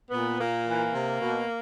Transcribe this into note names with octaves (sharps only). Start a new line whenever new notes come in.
A#2 B3
A#2 A#3
E3
C3
B2